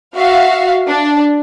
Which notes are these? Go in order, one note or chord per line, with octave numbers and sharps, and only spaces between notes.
F#4 E5 F5
D4